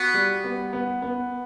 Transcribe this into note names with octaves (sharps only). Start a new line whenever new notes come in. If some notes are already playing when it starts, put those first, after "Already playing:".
Already playing: B3 F#4
G3
B3
B3
B3